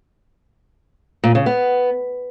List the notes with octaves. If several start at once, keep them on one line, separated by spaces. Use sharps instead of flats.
A#2
C#3
B3